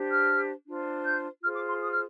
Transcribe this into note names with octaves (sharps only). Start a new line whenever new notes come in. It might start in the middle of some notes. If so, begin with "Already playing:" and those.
Already playing: D4 G4 C5
F6
D4 F4 C5
G6
F4 G#4 C5 F6
D6
C6
D#6
F6